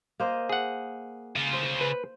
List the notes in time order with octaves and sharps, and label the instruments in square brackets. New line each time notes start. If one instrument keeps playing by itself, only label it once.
[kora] A#3 C5 D#5
[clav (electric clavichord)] G#4 F#5
[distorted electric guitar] C#3 F4
[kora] C5
[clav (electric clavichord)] B4